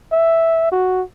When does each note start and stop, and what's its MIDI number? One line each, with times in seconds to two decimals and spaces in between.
0.12 0.68 76
0.72 1.02 66